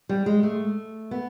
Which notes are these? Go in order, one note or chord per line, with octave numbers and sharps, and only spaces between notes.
G3
G#3
A3
B3